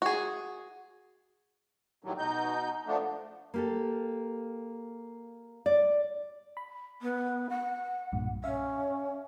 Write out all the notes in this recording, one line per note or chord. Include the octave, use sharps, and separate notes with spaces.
F#4 G#4
A2 D#3 E3 F#3 G3
B2 D#4 G6
F3 A3 B3 D4
A#3 G4 A4
D5
B5
B3
F#5
B1 G2 A#2
C#4 E5 F5